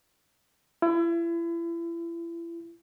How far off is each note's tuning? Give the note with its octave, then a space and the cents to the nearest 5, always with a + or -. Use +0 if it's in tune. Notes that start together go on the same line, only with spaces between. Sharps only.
E4 +35